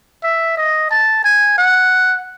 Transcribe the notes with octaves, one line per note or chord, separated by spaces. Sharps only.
E5
D#5
A5
G#5
F#5